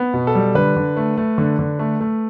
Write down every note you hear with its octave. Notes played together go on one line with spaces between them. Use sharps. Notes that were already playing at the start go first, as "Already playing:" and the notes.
Already playing: B3
B2
A4
G3
D3 B4
D3
A3
A3
D3
D3
A3
A3